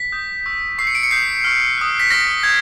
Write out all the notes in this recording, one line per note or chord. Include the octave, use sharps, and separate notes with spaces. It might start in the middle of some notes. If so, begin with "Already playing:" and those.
Already playing: B6
D#6 G6
C#6 E6 G6
C#6 E6 G6 C7
C#7
D7
C#7
D#6 G6 C7
C#6 F6
D#6 F#6
B6
C#6 F6 A#6
D#6 G6 G#6